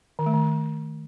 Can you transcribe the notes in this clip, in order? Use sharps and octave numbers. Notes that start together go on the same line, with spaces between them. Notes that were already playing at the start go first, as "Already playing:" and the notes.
D#3
A3
D#3